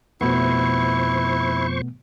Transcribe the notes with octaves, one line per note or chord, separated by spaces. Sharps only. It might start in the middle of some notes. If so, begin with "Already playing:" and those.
F2 B2 A3 B3 E4 C5 C#6